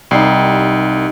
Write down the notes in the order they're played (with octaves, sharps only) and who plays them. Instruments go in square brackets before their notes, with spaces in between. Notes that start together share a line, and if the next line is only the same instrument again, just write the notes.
[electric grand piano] C2 C7 [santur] G3 D#4